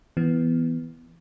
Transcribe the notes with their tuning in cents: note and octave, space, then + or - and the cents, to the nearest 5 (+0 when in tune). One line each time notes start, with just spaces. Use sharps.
E3 +0 B3 +0